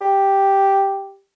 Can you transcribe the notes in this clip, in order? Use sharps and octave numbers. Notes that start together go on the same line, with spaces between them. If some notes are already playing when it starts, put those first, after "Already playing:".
G4